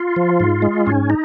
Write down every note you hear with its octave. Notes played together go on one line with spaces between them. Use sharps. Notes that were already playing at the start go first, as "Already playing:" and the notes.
Already playing: F4
F3
G#2
G#3
G#2 C#4
D#4